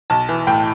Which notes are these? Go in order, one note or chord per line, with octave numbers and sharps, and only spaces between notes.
B1 A5
E3
A2 G5